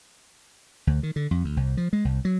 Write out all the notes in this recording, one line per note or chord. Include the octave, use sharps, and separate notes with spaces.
D2
D#3
D3
F2
D2
C2
F3
G#3
C2
F#3